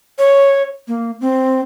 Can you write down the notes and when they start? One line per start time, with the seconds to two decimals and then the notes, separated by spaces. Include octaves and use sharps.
0.18 C#5
0.88 A#3
1.21 C4